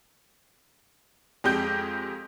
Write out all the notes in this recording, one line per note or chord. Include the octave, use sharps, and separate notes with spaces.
F2 G#3 G4 G6